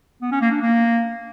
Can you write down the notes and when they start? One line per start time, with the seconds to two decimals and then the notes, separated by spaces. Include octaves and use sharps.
0.22 B3
0.32 C#4
0.42 A#3
0.51 D4
0.61 A#3